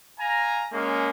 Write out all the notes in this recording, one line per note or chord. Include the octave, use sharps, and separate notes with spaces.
F5 G#5 A#5
G#3 A#3 C#4